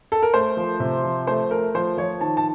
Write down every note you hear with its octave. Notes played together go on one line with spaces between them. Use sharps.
A4
A#4
A3 C5
F3
C3
F3
A3 C5
A3 A#4
F3 C5
F3 C#5
D#3 A5
A5